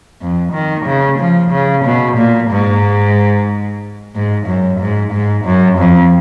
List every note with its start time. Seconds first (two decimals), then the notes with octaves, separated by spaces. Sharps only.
0.21 F2
0.54 D#3
0.86 C#3
1.20 F3
1.52 C#3
1.85 B2
2.17 A#2
2.50 G#2
4.15 G#2
4.47 F#2
4.80 G#2
5.13 G#2
5.46 F#2
5.78 F2